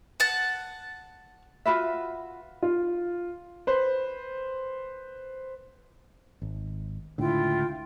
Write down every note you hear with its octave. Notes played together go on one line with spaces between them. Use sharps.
F#5 A5
F4 F#4 B4 E5
F4
B4 C5
G#1
C#2 A2 D3 E4 F4 G5